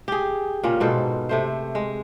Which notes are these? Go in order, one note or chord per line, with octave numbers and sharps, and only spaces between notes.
G4 G#4
A#2 C#3 C#4
G#2 B2 A4 C5
C3 A3 C5
G#3